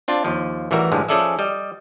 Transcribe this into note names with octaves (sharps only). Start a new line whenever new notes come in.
C4 D4 F4
D#2 F3
A1 E3 G3 F#4 A#4
A1 G2 D3 F3 G#3
F3 C#4 G#4 A4 D5 E5
G3 D#5